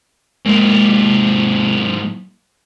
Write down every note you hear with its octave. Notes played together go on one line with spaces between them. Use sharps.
G#2 A#3